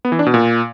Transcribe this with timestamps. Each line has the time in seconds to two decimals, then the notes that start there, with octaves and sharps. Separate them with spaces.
0.05 B3
0.12 E3
0.19 D4
0.26 B2
0.34 A#2